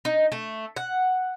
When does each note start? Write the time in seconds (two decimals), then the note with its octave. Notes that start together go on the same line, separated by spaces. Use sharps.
0.05 D#4
0.32 A3
0.76 F#5